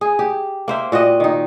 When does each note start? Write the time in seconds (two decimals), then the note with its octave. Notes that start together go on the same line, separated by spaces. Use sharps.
0.01 G#4
0.19 G4
0.68 A#3 C5 E5
0.92 A#2 F#4 G4 D#5
1.20 D#3 D#4